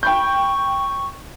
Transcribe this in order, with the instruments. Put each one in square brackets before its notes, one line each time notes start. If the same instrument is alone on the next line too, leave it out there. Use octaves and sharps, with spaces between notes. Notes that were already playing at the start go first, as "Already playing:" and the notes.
[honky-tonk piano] G5 B5 G6 [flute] C#6